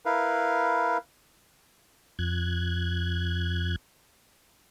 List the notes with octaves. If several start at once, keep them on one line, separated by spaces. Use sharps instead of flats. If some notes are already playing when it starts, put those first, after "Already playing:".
E4 A#4 B4 F5
F2 F#6 G#6